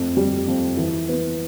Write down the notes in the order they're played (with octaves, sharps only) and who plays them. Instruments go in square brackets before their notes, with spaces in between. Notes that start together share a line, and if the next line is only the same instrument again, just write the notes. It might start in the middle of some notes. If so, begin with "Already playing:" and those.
Already playing: [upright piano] F2 A3
G3
F2
E3
B3